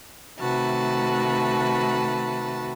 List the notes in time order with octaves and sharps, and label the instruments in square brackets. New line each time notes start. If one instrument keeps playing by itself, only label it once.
[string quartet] C3 D#3 A3 F#4 B4 A5